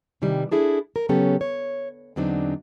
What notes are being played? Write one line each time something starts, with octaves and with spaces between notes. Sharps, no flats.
C3 D#3 E3 G3
D4 E4 G#4 A4
A#4
C#3 F#3 B3 C#4 G4 A4
C#5
E2 D3 F#3 C4 D4 D#4